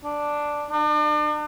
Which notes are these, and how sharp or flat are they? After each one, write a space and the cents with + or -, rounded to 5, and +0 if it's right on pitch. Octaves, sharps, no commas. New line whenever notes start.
D4 +0
D4 +40